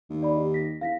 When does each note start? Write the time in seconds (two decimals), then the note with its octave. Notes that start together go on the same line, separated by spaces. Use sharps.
0.10 D#2
0.23 D5 B5
0.36 D#4 G4 D#5
0.54 A#6 B6
0.81 E2 F5 A#6 B6